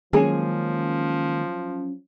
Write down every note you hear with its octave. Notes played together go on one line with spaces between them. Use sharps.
D#3 F3 F#3 G#3 A#3 C#4 G#4 G#5